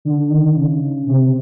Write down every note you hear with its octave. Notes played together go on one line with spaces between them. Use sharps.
D3
D#3
C#3
C3